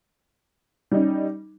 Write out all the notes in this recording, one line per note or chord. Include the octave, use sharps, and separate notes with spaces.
G3 C#4 D#4